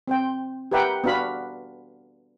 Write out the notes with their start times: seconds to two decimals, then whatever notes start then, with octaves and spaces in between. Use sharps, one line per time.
0.08 C4 C5 G5
0.72 G4 A#4 B4 E5 F#5 G5
1.04 B3 D4 F#4 F5 B5